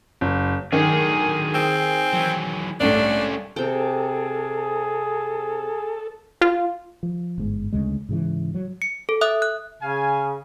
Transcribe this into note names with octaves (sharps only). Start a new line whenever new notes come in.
F#1
D3 D#3 F#3 G#4
C4
E3 F#3
C2 A2 C#4 D4 F4
C3 G#4 A4 G5
F4
F3
G1 G#2
D2 C#3 G#3
G#2 C#3 E3
F#3
C#7
A4
E5 D#6 F#6
F#6
C#3 F5 G#5